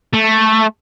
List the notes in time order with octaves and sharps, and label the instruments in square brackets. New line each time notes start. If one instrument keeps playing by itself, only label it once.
[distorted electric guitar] A3